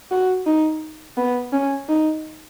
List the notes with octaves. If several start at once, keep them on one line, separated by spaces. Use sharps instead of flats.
F#4
D#4
B3
C#4
D#4